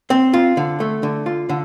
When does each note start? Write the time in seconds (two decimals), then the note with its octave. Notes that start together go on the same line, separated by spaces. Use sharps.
0.10 C4
0.34 F4
0.57 D3
0.80 A3
1.03 D3
1.26 F4
1.49 D3